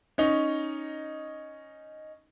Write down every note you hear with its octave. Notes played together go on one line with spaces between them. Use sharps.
C#4 D#4